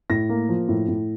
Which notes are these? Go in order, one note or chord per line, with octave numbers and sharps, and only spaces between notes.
A2 A#6
A#3
F3
A2
A2